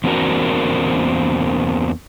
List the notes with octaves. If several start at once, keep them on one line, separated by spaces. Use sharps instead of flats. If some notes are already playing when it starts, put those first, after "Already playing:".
E2 A#3 C4 D4 F#4 A#4